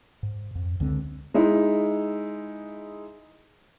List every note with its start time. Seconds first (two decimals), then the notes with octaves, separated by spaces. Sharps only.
0.23 G#2
0.55 F2
0.80 C#2 D3 G#3 C4
1.34 G#3 D#4 E4